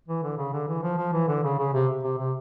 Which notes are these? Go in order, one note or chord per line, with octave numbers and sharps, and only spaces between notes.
E3
D3
C#3
D3
E3
F3
F3
E3
D3
C#3
C#3
C3
C3
C3